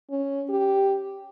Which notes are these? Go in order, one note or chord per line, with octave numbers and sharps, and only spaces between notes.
C#4
G4